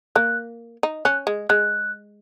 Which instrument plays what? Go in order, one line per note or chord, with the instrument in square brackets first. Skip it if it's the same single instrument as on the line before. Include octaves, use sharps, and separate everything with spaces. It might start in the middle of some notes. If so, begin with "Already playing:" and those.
[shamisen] A#3 [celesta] F#6
[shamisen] D#4
[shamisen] C#4 [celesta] F#6
[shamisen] G#3
[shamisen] G#3 [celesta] F#6